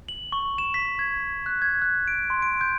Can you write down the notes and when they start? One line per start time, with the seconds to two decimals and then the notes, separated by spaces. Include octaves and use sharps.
0.09 F#7
0.32 C#6
0.58 E7
0.74 B6
0.99 G#6
1.46 F#6
1.62 G#6
1.82 F#6
2.08 D7
2.30 C6
2.42 D7
2.61 G6